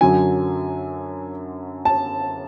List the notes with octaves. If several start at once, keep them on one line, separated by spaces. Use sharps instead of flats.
F#2 D3 F#3 G#5
A5